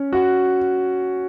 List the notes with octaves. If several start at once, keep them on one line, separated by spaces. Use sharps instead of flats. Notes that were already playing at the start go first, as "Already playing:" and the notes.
Already playing: C#4
F#4